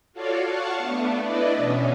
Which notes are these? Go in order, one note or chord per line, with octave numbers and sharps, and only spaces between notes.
F4 F#4 A4 C#5 D5 F5
F5 F#5 A5 C#6
A3 B3 D4
D4 E4 B4 D5 D#5
B2 E3 C#4